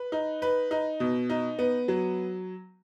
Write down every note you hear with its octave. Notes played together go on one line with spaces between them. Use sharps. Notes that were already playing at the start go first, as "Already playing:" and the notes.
Already playing: B4
D#4
B4
D#4
B2
D#4
B3
F#3